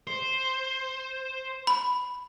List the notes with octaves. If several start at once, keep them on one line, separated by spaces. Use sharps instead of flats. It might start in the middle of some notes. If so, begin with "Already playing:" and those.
C5
B5